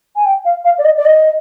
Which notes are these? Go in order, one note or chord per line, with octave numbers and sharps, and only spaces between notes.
G#5
G5
F5
F5
D5
D#5
D5
D#5